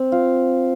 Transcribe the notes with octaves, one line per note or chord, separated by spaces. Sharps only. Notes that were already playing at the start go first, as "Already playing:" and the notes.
Already playing: C4
F4